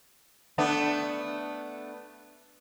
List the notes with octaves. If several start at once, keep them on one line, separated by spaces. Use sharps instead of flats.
A3 B3 D4